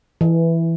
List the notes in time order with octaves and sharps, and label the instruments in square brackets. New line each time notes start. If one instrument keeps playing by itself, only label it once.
[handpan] E3